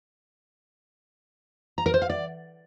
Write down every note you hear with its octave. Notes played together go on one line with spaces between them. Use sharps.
A#5
A#4
C5
F5
D5